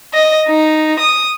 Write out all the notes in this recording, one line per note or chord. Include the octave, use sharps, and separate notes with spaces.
D#5
D#4
D#6